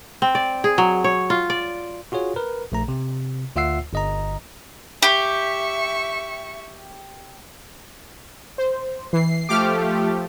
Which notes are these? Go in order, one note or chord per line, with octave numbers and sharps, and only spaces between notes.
C4
D5
G#4
F#3
C#5
F4
D5
F4 F#4 G#4 C#5
A#4 B4
A#1 A3 A#5
C3
D2 F4 E5 F#5 E6 C7
G1 D#5 A#5
G4 E5 C#6
C5
E3 C7
F3 A3 G4 D6 F6